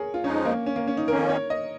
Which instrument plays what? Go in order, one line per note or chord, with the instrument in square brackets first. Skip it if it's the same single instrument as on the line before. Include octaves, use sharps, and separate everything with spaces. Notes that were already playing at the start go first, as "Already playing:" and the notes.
Already playing: [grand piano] G#4 A#4 C#5
F4
[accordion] F2 F3 G#3 D#4 [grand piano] C#4
[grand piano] A#3
C#4
A#3
C#4
D#4
[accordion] F2 D#3 A#3 C#4 [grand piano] A#4
[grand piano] C#5
D#5